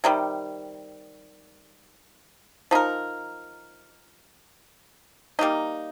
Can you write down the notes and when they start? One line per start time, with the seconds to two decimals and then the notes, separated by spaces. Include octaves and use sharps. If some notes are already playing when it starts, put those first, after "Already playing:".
0.04 C3 D#3 G3
2.71 F3 D#4 A#4
5.39 G3 A#3 D#4